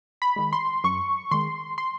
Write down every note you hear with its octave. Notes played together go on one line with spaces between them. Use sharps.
B5
D#3 G#3
C6
F#2 C#6
D#3 G#3 C6
C6